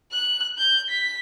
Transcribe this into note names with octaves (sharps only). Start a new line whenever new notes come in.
F#6
G6
B6